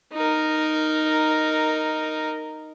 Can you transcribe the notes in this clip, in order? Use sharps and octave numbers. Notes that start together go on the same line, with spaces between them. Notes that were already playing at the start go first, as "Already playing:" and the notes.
D#4 A#4